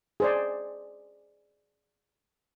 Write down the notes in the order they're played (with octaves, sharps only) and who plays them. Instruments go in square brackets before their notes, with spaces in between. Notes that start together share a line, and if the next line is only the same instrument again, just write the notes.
[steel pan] G#4 C5 D5